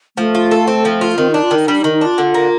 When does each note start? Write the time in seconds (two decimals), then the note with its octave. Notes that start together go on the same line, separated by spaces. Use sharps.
0.17 F3 A3
0.35 F4
0.51 A4
0.67 C4
0.85 F3
1.01 F4
1.17 D#3 C4
1.31 D4 D#4
1.43 F4
1.51 D#3 D#4
1.68 G3 D4
1.80 D#4
1.84 D#3
1.93 D#4
2.01 D4 F4
2.18 D3
2.34 A#3